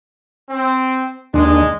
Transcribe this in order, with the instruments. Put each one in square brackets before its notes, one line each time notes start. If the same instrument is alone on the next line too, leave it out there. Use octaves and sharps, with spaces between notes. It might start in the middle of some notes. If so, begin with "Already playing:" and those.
[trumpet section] C4
[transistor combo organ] D#2 D4 [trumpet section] G#3